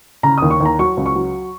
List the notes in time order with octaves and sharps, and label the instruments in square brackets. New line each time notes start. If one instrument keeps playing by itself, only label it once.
[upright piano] C#3 A#5
D#6
D#2
C#6
D#2 A#5
F#3 C#6
C#2
C#6
F#3